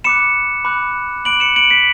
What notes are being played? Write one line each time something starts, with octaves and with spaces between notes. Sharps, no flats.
B5 D6 F#6 C#7 E7
B5 D6 F#6
B5 D6 F#6 D7 F#7
C#7 E7
D7 F#7
B6 D7